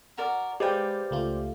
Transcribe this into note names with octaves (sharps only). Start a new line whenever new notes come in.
F#4 A#4 D5
G#3 G4 B4 C5 D5 F5 G5
C#2 A3 F4